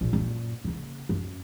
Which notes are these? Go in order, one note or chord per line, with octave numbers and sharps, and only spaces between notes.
A#1
F#2 A#2
C#3 A#3
F#2